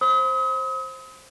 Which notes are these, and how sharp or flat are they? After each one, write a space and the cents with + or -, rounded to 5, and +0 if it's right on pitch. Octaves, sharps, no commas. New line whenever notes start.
C5 +15 B5 +45 D#6 +40